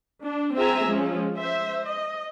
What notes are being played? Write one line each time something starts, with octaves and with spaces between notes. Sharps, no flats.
D4
C4 F4 G#4 E5 G#5 A#5
F3 G#3 C#4
C5 E5
D#5